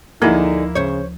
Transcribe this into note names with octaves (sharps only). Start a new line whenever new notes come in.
D2 D3 F3 A#3 D#4 E4 G#4 A#4
C#3 C5 C#5